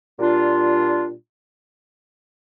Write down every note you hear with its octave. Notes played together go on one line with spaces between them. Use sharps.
A#2 G3 D4 F4